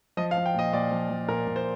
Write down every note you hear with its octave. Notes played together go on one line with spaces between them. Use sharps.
F3 D#5
F5
F3
G5
A#2 D#5
A#2 D5
F3
F3
A#2 A#4
A#2
C5